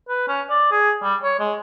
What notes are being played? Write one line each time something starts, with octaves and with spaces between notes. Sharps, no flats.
B4
C#4
D5
G#4
G3
C#5
G#3